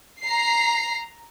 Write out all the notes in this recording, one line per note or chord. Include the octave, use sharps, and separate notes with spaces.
A#5 C7